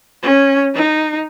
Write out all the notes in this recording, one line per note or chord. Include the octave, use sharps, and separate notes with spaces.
C#4
D#4